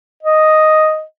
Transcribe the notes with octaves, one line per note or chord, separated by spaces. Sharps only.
D#5